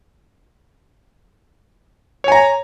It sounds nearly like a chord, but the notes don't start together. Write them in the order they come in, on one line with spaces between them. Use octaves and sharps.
C#5 G#5 A#5